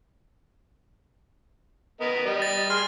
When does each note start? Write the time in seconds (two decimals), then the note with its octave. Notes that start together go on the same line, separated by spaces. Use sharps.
2.01 B3 A#4 D#5
2.26 G3 D#5
2.42 A6
2.70 G#4 C6 F6